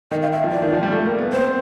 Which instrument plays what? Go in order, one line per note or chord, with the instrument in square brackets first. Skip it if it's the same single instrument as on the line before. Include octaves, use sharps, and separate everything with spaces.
[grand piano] D#3 [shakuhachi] D#5
[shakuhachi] F5
E5
[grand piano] F3
[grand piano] E3 [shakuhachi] D5
[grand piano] D#3
F3
G3
A3
A#3
B3
[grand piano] C4 [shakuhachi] C5